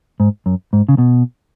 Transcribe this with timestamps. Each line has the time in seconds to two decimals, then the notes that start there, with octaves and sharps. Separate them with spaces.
0.20 G#2
0.46 F#2
0.73 G#2
0.89 C#3
0.98 B2